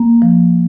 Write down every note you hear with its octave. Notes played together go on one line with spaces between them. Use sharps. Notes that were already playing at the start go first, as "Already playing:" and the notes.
Already playing: A#3
F3